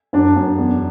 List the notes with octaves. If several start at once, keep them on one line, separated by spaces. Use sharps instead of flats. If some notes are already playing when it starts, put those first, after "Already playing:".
F#2 D4
F#2
E2